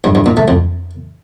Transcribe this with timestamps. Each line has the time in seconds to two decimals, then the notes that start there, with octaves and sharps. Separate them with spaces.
0.04 G2
0.15 G2
0.26 A#2
0.37 A3
0.48 F2